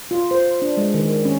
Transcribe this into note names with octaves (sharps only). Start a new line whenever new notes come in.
F4
C5
D4
G#3
D#3
C#4